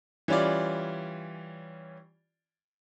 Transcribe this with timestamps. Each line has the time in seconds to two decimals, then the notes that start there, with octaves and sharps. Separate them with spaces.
0.28 E3 G3 C#4 F4 D5